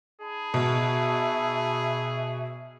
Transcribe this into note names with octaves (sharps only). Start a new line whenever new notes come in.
D#4 G#4 A5 B5
B2 E5